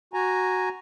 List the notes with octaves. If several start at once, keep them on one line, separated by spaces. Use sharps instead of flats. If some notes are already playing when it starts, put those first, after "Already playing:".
F#4 G#5 A#5